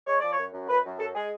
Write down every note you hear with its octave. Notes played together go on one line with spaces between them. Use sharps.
G#3 C#5
F3 D5
C#5
F#2
F#2
F#2 B4
F#2
F#2 A4
G#3 G#4